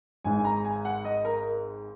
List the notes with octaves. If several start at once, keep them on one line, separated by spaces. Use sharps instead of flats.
G#1 G#2 G#3 G#5
G#5
A#5
G#5
F#5
D#5
A#4